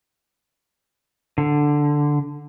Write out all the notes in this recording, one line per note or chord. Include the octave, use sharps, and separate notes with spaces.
D3